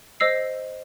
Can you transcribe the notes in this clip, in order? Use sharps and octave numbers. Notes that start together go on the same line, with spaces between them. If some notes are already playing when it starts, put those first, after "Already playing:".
C5 D#5 E6 C7